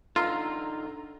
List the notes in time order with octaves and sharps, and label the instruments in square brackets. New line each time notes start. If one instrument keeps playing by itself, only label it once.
[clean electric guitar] D4 D#4 A4 [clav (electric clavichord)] F4 [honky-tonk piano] A#5 E6